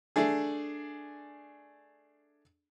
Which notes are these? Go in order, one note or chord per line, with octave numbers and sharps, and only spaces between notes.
A3 D4 G#4